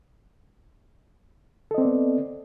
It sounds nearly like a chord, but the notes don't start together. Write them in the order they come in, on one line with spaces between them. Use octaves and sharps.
A4 D#5 C4 D5 B3